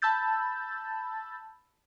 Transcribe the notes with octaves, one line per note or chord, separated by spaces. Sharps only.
A5 B5 E6 G6 A6